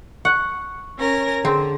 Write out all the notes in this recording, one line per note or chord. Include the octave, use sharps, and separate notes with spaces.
F#5 C#6
C#4 A#4 A#6
D3 C4 G#4 C6